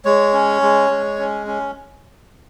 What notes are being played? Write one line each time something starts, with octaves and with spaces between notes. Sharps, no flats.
G#3 C#5
C#4
G#3
G#3
C#4
C#4